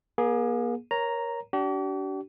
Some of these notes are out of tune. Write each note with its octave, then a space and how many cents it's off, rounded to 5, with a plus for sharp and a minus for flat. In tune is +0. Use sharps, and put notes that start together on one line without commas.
A#3 +40 G#4 +0
A#4 +20 C#5 +0 A#5 +0
D4 -25 G4 -45